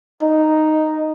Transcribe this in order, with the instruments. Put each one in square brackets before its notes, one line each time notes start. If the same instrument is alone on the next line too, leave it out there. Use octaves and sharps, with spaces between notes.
[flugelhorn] D#4